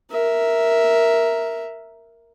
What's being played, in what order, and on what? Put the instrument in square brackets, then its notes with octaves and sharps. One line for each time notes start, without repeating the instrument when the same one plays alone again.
[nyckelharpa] A#4 E5